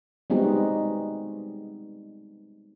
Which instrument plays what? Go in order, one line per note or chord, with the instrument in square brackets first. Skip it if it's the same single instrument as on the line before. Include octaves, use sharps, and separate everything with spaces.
[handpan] G3 G#3 B3 C4 D#4 F#4